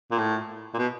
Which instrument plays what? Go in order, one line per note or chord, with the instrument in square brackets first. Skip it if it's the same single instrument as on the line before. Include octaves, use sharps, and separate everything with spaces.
[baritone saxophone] A#2
A2
A#2
B2